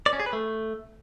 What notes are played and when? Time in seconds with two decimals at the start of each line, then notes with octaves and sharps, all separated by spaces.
0.06 D5
0.13 C#4
0.20 G#4
0.26 B4
0.33 A3